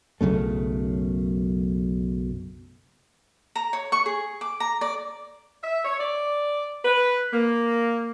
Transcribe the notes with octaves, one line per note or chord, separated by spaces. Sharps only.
B1 F#2 C#3 A3
A#5
C#5
C#6
G#4
D6
A#5
D5
E5
C#5
D5
B4
A#3